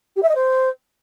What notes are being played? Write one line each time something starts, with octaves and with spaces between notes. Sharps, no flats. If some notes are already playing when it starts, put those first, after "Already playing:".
G4
E5
D#5
C5